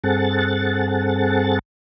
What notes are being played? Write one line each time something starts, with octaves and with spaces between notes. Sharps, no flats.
G2 C4 G#4 A4 F#5 A6